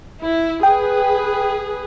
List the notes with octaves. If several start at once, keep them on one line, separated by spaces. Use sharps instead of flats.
E4
G#4 B4 G5